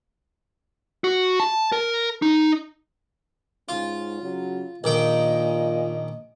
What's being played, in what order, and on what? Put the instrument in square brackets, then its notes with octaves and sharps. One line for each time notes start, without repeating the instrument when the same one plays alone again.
[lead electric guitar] F#4
A5
A#4
D#4
[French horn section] G#2 C#4 [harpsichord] F4
[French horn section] C#3 F#3
[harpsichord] A#1 D#3 G5 [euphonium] A#2 [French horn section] D#5